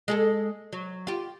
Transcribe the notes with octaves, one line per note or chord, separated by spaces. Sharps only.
G#3 G#4 A4
F#3
F4 G4